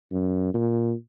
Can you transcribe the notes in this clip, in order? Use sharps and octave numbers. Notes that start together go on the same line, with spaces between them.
F#2
A#2